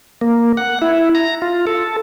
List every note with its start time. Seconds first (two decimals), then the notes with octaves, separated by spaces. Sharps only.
0.21 A#3
0.57 F#5
0.82 E4
1.15 A#5
1.42 F4
1.67 A4